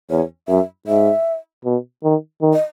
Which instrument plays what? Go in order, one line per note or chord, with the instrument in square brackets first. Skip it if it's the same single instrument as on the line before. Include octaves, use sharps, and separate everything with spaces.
[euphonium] E2 [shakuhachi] C#5
[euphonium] F#2 [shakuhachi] E5
[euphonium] G#2 [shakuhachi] E5
[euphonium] B2
D#3
D#3
[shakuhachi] D#5